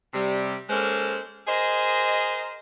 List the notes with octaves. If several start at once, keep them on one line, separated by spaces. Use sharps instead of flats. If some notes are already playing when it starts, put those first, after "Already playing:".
C3 G3
G#3 A#3 C#4 A4 C5
G#4 A#4 C5 D#5